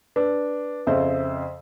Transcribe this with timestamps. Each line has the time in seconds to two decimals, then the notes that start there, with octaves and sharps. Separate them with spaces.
0.16 D4 B4
0.87 F2 C#3 C5 E5